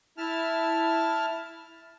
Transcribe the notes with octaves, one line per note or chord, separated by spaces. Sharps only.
E4 A5 F6